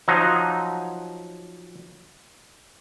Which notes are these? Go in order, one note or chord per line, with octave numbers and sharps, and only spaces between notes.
F3 F#3 D#4